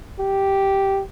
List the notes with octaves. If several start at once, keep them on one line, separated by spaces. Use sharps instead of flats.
G4